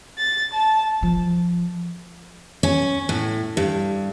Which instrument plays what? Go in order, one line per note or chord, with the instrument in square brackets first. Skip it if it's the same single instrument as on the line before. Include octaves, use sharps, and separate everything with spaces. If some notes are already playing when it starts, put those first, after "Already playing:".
[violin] A6
A5
[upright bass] F3
[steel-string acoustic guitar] C#4
A2
G2